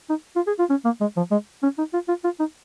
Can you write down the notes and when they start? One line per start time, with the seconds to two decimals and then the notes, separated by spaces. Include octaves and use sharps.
0.09 D#4
0.36 F4
0.47 G#4
0.59 F4
0.70 C#4
0.85 A#3
1.01 G#3
1.17 F3
1.31 G#3
1.63 C#4
1.78 D#4
1.93 F4
2.08 F4
2.24 F4
2.40 D#4